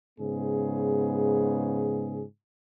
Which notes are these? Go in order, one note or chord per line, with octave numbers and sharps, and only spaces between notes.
G#2 C#3 B3 G#4